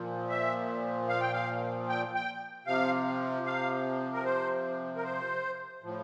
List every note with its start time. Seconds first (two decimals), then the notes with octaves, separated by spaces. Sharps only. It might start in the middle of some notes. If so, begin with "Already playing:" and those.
Already playing: A#2 F3
0.30 E5
1.09 F5
1.20 G5
1.33 F5
1.88 G5
2.15 G5
2.66 C3 F3 F5
3.46 F5
4.13 A#4
4.25 C5
4.96 A#4
5.03 C5
5.83 A2 F3